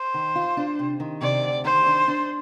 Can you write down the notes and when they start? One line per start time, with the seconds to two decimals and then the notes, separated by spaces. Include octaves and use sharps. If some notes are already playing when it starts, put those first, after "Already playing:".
Already playing: C5
0.14 D#3
0.35 F4
0.57 D4
0.79 C3
1.00 D#3
1.21 C3 D5
1.44 D2
1.65 D#3 C5
1.86 D4
2.08 D4